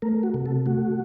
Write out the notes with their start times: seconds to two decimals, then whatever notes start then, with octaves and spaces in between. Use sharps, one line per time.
0.02 A3 A#4
0.23 F#4
0.34 C3
0.46 A4
0.66 A3 F#4